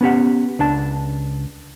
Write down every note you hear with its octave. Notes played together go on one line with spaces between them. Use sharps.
B3 C#4 G4 F#5
C#2 D4 A5